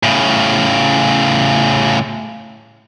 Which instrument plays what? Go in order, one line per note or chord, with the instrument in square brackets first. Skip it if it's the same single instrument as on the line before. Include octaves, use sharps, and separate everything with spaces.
[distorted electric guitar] A2 C#3